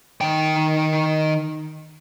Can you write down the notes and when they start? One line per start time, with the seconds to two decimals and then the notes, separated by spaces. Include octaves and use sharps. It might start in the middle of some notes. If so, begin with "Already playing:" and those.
0.21 D#3 G5